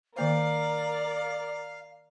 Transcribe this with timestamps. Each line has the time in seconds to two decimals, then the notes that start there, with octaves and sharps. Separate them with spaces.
0.16 D#3 A#3 A#4 C5 D5 F5